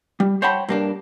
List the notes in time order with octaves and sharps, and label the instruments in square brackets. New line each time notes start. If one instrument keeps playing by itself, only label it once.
[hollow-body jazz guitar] G3
C5 C#5 F#5 G5 A5 B5
G2 A#3 D4